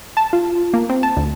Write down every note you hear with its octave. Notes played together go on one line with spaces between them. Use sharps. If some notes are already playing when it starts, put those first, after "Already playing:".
A5
F4
A#3
C4
A5
D2